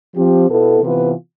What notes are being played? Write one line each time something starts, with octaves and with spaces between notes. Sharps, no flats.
F3 C4 G4
B2 B3 E4 A4
C3 E3 B3 F4 B4